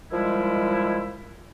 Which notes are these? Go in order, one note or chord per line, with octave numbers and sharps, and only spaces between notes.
D#3 F3 G3 G#3 E4